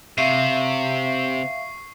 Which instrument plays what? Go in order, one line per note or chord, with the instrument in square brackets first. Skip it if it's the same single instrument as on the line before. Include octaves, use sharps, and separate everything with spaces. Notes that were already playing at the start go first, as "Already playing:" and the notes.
[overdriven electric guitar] C3 [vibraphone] E5 F5 [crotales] C#6 C7